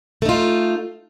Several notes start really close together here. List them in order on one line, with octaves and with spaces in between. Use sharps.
A3 D#4 F4